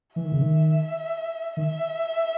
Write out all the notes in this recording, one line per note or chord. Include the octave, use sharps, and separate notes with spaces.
E3 E5
D#3
C#3
D#3
D#3 E5